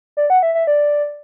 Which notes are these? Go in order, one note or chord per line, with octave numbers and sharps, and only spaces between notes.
D5
F#5
E5
E5
D5